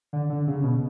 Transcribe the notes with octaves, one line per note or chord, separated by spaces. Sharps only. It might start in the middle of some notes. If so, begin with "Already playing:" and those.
D3
D3
C#3
B2